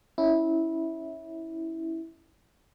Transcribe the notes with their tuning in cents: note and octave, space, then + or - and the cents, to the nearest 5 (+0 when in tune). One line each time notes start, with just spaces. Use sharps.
C#4 +0 E4 -15